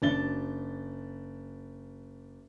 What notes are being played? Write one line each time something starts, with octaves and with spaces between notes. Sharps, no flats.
F#1 D4 A6 G7